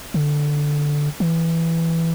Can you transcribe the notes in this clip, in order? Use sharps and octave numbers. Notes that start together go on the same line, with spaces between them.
D3
E3